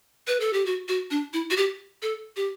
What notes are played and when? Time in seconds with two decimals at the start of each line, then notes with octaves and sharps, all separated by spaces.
0.27 B4
0.40 A4
0.53 G4
0.66 F#4
0.88 F#4
1.11 D4
1.33 E4
1.50 F#4
1.57 G4
2.02 A4
2.36 G4